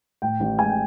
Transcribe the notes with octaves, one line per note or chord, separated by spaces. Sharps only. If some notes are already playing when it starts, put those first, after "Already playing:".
A2 G5
A1
G#3 G#5
G5